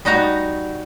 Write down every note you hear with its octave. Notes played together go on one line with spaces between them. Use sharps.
G3 D#4 F#4 A#5